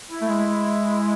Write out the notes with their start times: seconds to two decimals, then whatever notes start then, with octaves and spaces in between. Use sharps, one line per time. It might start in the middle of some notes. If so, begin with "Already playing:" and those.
0.11 E4
0.22 A3
0.29 G#3